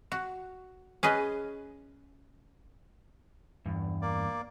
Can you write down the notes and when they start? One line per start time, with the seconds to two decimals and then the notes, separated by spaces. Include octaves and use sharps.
0.12 F#4
1.03 C#4 G#4 B4 D#5
3.66 E2 G2
4.02 A#3 D5